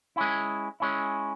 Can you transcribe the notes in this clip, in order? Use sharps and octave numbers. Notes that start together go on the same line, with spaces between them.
G#3 C#4 E4
G#3 C#4 E4